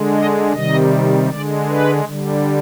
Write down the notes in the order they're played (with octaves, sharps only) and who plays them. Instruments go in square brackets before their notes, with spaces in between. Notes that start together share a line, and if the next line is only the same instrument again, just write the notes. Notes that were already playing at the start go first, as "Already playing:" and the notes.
Already playing: [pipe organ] D3 G#3
D#5
C3 D#3 G3 D#5
D3 G#3 D5
B4
D3 G3